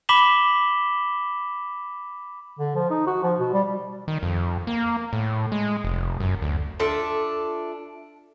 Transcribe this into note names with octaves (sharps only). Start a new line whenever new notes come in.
B5 D6 B6 E7 F#7 G7
D3
F3
D#4
F#4
F3
B2
G3
D#3
F2
A#3
A2
G#3
F1
F#2
D2
D4 F4 A4 E5